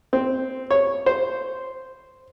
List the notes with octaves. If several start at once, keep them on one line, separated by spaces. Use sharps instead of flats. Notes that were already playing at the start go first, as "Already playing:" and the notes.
C4
C#5
C5